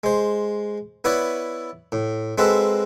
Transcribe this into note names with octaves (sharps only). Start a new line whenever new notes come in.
G#3 C5
B3 E4 B4 C#5 D5
A2
G#3 C4 F#4 A4 B4